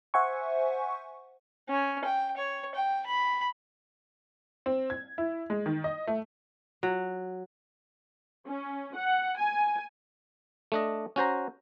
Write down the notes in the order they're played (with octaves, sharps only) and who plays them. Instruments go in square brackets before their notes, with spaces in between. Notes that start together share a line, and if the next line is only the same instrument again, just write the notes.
[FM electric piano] C5 E5 F#5 G#5 C#6
[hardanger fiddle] C#4
G5
C#5
G5
B5
[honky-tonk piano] C4
G#6
E4
G#3
D#3
D#5
A3
[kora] F#3
[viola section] C#4
F#5
G#5
[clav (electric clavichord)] A3 D4 D#5
C#4 F#4 C5 A#5